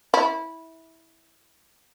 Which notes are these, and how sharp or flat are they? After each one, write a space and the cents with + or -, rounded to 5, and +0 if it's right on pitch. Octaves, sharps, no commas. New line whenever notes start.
E4 -15